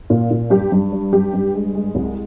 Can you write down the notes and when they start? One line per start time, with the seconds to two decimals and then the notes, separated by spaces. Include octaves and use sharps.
0.10 A#2
0.31 A#2
0.50 G2 G4
0.72 G2
0.92 G3
1.13 G2 G4
1.33 G2
1.54 G#3
1.75 G#3
1.95 C2